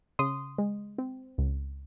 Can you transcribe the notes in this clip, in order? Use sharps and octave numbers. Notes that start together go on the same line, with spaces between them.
C#3 C6 D#6
G#3
C4
C#2